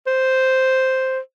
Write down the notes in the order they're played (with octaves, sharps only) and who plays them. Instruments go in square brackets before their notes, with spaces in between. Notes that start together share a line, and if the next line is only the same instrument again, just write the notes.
[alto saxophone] C5